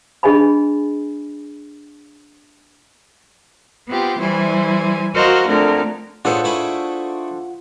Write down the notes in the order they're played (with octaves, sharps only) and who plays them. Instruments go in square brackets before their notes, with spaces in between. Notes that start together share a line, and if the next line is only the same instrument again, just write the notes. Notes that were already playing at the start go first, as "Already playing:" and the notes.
[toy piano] D4 G#4 D#5 G#5 B5
[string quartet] B3 C4 F4 G4
E3 G3 E4 C5 G#5
F#4 A#4 C5 D#5 F5
F2 D3 A3 A#4
[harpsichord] A2 B3 G#4 [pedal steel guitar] D4 A4 C5 [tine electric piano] F4 F#5
[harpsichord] A3 E4 G#4